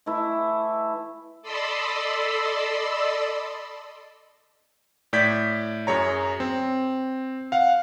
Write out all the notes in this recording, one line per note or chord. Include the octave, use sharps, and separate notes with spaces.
E3 A3 E4
A4 D5 D#5 B5 C6 E6
A2 D5 G6 G#6 B6
F#2 G#4 C#5 A#5
C4
F5 F#5